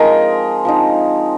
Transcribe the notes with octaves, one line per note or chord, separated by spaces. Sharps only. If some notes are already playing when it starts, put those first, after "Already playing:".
Already playing: F3 G#3 C4 D#4 A#4 D#5
F3 C4 D#4